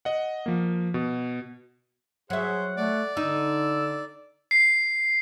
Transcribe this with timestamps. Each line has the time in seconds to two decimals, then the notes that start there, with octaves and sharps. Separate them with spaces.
0.05 D#5 F#5
0.46 F3 A#3
0.94 B2
2.30 F#3 G#4 C5 E5 F#5
2.77 A3 D5 F#5
3.17 D3 D#4 E6
4.51 C7